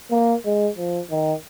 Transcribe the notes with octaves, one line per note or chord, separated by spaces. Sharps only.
A#3
G#3
F3
D#3